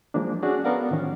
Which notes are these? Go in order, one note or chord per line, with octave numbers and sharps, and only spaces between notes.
F3 G#3 A#3 D4
C#4 D4 F#4 G#4 D5
B3 A4 A#4 D5 F5 F#5
A2 D#3 F3 C#4